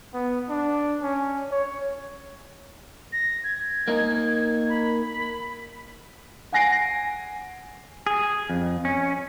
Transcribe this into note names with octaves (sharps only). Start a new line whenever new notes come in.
B3
D4
C#4
C#5
A#6
G#6
A#3 D#4
B5
F#5 G#5 A#6 C7 D7
G#4
F2
C#4